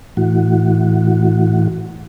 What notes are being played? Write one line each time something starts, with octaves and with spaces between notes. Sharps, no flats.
A2 E3 F#4